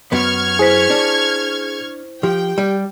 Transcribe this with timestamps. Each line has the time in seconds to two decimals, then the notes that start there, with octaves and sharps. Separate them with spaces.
0.12 F#2 B3 C#6 F6 G#6
0.59 E4 G#4 C5 B6
0.90 D4
2.23 F3 G4 G5
2.58 G3